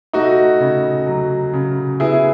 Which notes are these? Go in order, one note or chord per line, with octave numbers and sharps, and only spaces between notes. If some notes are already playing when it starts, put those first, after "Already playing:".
A3 D#4 F#4
C#3
F#3
C#3
B3 E4 G#4